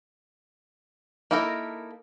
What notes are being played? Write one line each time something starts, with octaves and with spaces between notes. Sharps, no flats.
A#3 D#4 E4 A4 A#4